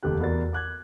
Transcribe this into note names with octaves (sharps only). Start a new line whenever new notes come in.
F1 D#2 A3 G4 F#6
E2 F#4 A#4 D5 A6
D6 F#6 G#6